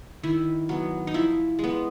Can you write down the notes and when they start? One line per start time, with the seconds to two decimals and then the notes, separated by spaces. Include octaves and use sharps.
0.23 D#3 E4
0.69 F#3 B3
1.07 D#4
1.14 F3 E4
1.59 G#3 B3